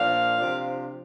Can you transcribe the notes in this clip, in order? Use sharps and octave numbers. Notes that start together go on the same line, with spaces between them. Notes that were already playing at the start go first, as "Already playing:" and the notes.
Already playing: A#2 F3 D4 F5
C3 F3 D4